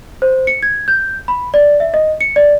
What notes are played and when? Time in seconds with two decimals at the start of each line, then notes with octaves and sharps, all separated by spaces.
0.22 C5
0.47 C#7
0.63 G#6
0.88 G6
1.28 B5
1.54 D5
1.80 E5
1.94 D#5
2.21 C#7
2.36 D5